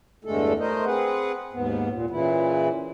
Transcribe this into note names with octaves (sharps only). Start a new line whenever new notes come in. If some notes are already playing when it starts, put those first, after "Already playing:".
E2 G2 D3 G#3 A3 A4
A3 A#4 C5 D#5
C4 G#4 B4 F#5
D#2 G#2 B3
A#2
A#2 C#3 E3 E4